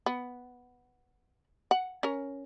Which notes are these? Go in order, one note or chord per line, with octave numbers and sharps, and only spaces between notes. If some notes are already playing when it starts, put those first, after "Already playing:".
B3
F#5
C#4 A#4